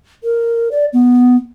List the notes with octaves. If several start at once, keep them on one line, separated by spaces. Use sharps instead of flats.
A#4
D5
B3